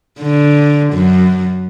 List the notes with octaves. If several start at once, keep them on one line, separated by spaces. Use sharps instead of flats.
D3
F#2